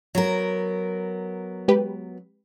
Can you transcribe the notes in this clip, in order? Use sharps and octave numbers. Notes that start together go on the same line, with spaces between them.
F#3 B3 A#4
G#3 G4 B4